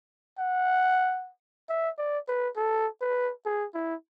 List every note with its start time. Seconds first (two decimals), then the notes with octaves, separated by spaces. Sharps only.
0.38 F#5
1.69 E5
1.98 D5
2.28 B4
2.57 A4
3.01 B4
3.45 G#4
3.74 E4